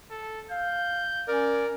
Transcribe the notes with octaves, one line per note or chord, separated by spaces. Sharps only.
A4
F5 G6
C#4 A#4 D5